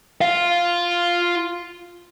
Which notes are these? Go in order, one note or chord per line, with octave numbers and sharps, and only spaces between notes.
F4 F5